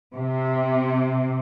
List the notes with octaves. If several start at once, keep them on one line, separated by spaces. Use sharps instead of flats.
C3